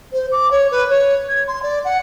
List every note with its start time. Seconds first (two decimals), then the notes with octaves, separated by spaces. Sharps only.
0.12 C5
0.31 D6
0.50 C#5
0.71 B4
0.89 C#5
1.28 G#6
1.47 C6
1.62 D5
1.84 F#5